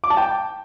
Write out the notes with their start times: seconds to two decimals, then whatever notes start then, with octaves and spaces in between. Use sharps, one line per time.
0.04 D6
0.10 A5
0.17 G5